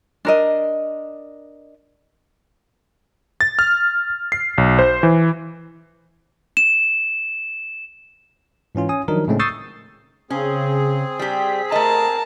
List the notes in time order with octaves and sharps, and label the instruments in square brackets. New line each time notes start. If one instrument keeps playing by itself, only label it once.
[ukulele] D4 A#4 D#5
[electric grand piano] A6
F6
C7
B1
C5
E3
[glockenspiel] E7
[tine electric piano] G#2 E3 C#4 F4
C#4 G#5 D#6
D#3 F3 F#3 D4 D#4 A#4
A2 C#3 G#3 A3 C4 C#4
C#6 D#6 E6 G6 A6 C7
[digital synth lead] C#3 [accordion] C4 G#4 [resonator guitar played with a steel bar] C#4
[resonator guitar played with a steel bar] G3 G4 [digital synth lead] B6
[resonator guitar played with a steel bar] A3 D#5 [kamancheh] A#4 A5